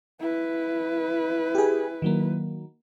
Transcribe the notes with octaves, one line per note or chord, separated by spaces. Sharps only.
E4 B4
G4 G#4
D#3 F#3 A#3